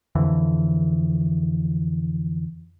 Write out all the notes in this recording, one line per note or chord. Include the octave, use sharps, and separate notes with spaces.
F2 D3 E3